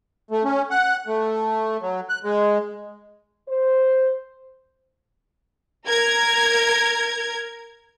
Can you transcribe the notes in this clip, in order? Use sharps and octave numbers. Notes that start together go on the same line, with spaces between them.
A3
C#4
F#5
A3
F#3
F#6
G#3
C5
A#4 G#6